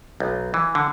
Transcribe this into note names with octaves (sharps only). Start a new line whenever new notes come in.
B1
E3
D3